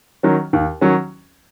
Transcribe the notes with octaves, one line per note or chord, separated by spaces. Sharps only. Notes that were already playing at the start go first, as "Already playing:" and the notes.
D#3 F#3 C#4
D#2
D#3 F#3 C#4